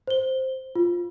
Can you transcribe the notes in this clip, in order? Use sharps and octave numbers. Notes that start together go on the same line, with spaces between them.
C5 G7
F4